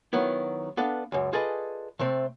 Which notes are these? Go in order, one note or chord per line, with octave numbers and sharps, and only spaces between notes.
D#3 F#3 B3 E4
B3 D4 A4 B4 F5
C#2 F#2
F4 G#4 A4 B4 D5 D#5
C3 A3 C4